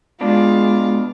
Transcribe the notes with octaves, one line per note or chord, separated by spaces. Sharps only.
B2 G#3 D4 F4